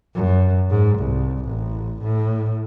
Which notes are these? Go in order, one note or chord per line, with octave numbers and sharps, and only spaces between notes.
F#2
G#2
C2
A1
A2